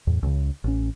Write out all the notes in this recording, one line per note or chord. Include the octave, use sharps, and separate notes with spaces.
E2 A2
C#2 C#3
A1 C#4